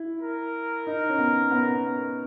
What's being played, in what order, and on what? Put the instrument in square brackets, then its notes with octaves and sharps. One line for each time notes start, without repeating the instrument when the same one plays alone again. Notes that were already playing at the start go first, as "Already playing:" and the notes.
Already playing: [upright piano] E4
[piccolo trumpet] A#4
[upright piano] D#4
C#4
B3
B3